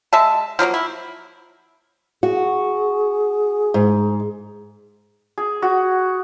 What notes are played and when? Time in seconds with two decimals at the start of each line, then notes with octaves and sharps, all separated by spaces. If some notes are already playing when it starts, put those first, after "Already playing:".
0.13 G#3 E5 A5
0.59 F3 F#3 G#3 A#3
0.74 E4
2.23 F#4 G#4
3.74 G#2
5.38 G#4
5.62 F#4